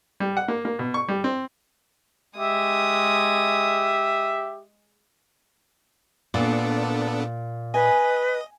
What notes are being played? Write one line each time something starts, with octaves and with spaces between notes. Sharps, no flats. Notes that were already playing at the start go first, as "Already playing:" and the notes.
G3
F#5
A#3
A#3
B2
C#6
G3
C4
G#3 G4 E5 D#6
A#2 B3 D4 A4
B4 D#5 G#5